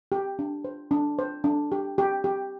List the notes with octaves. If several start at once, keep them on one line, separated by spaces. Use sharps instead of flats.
G4
D4
C5
D4
C5
D4
G4
G4
G4